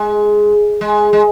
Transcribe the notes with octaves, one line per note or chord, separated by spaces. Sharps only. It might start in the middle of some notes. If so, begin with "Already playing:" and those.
Already playing: G#3
G#3
G#3